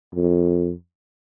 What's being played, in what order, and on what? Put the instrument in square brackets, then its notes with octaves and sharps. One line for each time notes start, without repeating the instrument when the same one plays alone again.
[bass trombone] F2